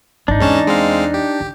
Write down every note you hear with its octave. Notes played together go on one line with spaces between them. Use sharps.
G#1 D#3 D4 D#4
E2 G#2 C#4 A5
G#3 C4 F5
G4
D3